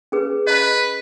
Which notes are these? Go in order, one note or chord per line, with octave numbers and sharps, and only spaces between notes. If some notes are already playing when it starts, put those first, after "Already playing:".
C#4 G#4 B4
B4 D#5 A#5